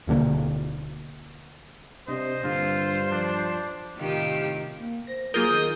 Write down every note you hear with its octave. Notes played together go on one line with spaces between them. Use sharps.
D1 B2 D3 A#3
C3 D4 C5 D#5
G2 D3 A#3 F4
F3 D4
A2 C3 D#3 F4 G4
A#3
C5 A#6
F#3 A#3 F4 G#4 A#4 D#6 G6
D#3